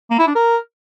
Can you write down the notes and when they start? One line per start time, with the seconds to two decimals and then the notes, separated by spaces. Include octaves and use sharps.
0.11 A#3
0.19 E4
0.27 D4
0.35 A#4